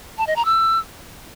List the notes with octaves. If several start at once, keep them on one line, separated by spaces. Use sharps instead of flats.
A5
D#5
A#5
E6